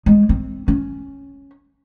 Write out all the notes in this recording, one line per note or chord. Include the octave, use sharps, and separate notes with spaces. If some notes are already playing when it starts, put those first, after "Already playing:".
G#3
C4
C#4